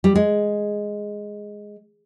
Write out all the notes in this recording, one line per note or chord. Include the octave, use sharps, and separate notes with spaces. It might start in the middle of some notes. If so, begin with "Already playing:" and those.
G3
G#3